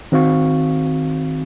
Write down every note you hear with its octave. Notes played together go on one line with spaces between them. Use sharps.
D#3 C4 F#4 F5 C#6